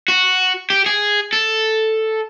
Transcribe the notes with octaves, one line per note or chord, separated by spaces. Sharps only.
F#4
G4
G#4
A4